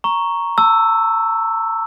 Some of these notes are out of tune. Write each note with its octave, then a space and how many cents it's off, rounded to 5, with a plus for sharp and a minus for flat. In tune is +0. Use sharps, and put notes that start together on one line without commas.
A#5 +0 C#6 +0
A5 +40 E6 +0